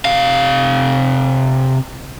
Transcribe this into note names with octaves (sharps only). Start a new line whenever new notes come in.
C3 F5